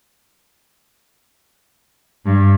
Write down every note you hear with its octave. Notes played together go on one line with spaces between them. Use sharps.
G2